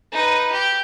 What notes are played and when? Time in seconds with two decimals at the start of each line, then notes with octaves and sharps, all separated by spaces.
0.12 D#4 B4
0.51 G4